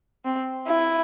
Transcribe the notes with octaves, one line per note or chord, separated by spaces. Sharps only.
C4
E4